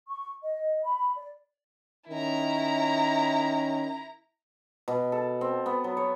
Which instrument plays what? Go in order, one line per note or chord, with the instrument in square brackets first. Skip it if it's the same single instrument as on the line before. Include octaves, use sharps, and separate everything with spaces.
[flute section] C#6
D#5
B5
D5
[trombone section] D#3 C#4 [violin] E4 A#5
[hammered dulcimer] B2
A4
C4
B3
F#3
C#5